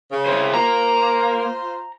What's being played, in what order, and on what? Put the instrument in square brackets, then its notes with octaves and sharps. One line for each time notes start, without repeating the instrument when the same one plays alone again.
[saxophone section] C#3
[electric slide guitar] E4 G4 C5
[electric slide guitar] A#3 [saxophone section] F4 C5 [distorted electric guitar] A#5